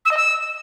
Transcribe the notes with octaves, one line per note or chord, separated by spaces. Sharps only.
E6
D#5
E6